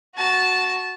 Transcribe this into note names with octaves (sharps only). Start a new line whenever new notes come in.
F#4 A5